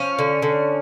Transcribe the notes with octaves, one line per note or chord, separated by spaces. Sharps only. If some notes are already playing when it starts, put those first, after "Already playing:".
Already playing: F3 C#4
D3
D3